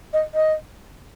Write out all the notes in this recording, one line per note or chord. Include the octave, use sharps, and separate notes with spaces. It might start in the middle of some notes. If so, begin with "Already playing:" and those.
D#5
D#5